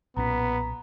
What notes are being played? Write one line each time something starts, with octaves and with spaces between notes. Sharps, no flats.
B1 A#2 B3 C#4 A#5 B6